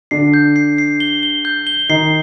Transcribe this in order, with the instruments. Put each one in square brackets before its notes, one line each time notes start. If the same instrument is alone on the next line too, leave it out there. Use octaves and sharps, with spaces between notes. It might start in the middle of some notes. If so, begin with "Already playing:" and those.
[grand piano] D3 D4 [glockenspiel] C7
[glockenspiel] G6
C7
C7
G7
G7
G6
G7
[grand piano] D#3 D#4 [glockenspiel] C7